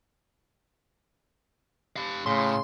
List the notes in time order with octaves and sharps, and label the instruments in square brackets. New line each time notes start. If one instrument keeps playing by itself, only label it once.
[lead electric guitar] G4 F5
[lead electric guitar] A2 [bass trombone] C#3 [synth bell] C6